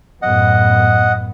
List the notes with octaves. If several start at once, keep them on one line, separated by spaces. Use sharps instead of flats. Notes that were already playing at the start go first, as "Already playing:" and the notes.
F#2 A2 B3 D#5 F#5